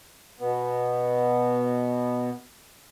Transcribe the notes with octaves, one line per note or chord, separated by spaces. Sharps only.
B2 B3